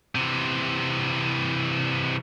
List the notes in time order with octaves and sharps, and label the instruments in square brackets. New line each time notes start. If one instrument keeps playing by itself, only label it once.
[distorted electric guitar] C3 E3